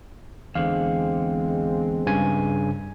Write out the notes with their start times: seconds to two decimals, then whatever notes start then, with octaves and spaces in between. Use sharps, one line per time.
0.55 E2 D3 G#3 C4 F5
2.06 G2 C#3 G#5